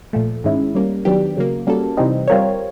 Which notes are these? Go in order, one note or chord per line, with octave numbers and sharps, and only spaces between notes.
A#2 F3 A3
G#2 D#3 G#3 C#4 E4
G3 A#3 C#4
D#3 F#3 B3 D4 G4
C#3 F#3 A#3
G3 A#3 C#4 F#4 A4
C3 E3 G3 C4 D#4
G3 C4 F4 A#4 C#5